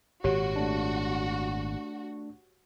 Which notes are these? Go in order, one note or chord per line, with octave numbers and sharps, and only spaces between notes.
G#1 A#2 F#4 G4 C#5
A3 D4